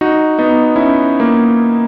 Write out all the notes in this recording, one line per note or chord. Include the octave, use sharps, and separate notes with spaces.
D#4 F#4
B3 D#4
C#4 E4
A#3